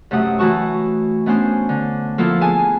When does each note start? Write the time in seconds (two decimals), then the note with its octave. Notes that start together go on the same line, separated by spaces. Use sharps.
0.11 F#2 C3 A3 F#5 D#6
0.39 E3 A3 F#4 A5 C#6
1.26 A3 B3 C#4 D4 C5
1.69 D3
2.18 F3 A#3 B3 E4 F4 A4
2.41 B3 G#4 G#5 A5